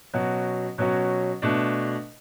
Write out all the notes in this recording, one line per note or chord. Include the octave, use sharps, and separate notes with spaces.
B2 F#3 C#4 F#4
B2 F#3 C#4 F#4
B2 A3 D4